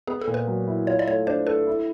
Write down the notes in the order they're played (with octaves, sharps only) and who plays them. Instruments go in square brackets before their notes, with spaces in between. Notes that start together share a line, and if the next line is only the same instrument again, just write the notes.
[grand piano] B3 [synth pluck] G#4
[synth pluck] A4
[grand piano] A#2
[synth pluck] B4
[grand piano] F#3
E4
[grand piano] F4 [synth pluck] C#5
[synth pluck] D5
[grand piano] A3 [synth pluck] C#5
[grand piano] D4 [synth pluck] C5
[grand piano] A4 [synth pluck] B4
[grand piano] E4